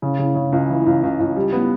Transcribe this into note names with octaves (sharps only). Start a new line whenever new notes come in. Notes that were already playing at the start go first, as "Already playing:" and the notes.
C#3
C#3
C#3
C#2
E3
C#2
C#2
C#2
G3
B3